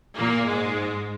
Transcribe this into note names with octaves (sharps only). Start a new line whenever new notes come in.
A#2 A#3
G#2 G#3